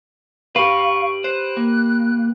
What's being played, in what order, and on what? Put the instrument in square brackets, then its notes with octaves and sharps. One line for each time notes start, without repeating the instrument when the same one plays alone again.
[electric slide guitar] G4 B4 [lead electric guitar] F5 [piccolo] C#6
[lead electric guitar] C5 [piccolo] F#6
[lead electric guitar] A#3